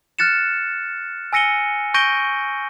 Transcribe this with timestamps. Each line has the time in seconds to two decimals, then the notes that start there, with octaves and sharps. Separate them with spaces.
0.19 F6 F#6 A6 C#7 E7
1.33 G#5 E6 A#6 C#7 D#7 G7
1.94 C#6 G6 A#6 D7 D#7 G7